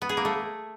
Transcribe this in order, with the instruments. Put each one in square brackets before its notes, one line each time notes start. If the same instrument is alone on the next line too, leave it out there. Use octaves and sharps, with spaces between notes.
[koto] B3
G#4
A#3
A3